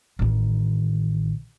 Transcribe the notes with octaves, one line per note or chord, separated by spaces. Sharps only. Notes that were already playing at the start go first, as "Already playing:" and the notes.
A1 D#3